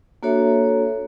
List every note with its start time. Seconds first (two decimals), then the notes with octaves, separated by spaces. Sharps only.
0.23 A#3 D4 F#4 A4 C#5 E5